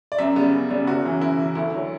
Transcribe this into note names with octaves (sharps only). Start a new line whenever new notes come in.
D5
F#2 E5
C#3 G3 B3
F#2
C#3 G3 B3
F#1 F#4
F#2 E3
F#1 E4
F#2 E3
D2 E4
D3 F#3